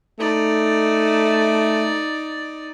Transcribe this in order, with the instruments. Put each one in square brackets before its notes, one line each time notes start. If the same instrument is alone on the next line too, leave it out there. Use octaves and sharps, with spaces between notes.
[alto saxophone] A3 [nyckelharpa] D#4 D5